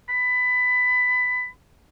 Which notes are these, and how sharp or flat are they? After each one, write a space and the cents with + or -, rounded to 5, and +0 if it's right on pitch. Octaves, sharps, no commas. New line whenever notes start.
B5 +20